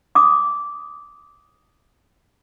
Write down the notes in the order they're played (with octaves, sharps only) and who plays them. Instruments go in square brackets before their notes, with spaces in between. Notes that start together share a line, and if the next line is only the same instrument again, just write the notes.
[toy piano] D6 D#6